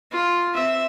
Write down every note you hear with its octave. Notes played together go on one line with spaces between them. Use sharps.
F4
C4 E5